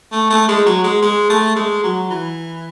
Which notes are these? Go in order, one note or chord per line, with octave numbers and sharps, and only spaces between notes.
A3
A3
G#3
F#3
G#3
G#3
A3
G#3
F#3
E3